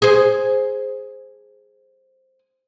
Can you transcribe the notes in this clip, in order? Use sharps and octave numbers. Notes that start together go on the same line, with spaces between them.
G#4 C5